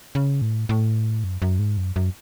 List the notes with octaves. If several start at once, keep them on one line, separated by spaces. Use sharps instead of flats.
C#3
A2
A2
F#2
F#2
G#2
F#2
F#2